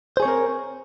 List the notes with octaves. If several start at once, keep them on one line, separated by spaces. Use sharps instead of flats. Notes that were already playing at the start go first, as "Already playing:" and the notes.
C4 G#4 A#4 C5 C#5